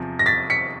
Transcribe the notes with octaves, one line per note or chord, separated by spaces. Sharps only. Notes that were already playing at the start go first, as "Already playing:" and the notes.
Already playing: E2 C3 F3
A#6
A6 B6
B6 C#7